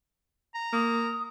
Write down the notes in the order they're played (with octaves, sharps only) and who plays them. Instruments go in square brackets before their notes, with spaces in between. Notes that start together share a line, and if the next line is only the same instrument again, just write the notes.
[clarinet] A#5
[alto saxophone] A#3 [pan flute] D#6